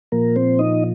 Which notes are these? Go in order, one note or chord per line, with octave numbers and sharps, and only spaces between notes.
A#2 F3 A#3 A#4
C4 C5
D#4 D#5